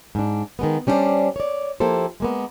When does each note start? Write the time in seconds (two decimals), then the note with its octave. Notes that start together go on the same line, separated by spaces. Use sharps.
0.15 G#2 D4
0.59 D#3 G#3 B3
0.87 G3 C#4 D4 F4 C5 D5
1.36 C#5 D5
1.80 F3 A#3 E4 G4 A4 C5
2.20 G#3 A#3 B3